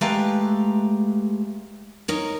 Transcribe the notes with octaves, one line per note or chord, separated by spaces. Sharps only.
G#3 A3 G4 B4 F5 A#5
D#4 A#4 C#5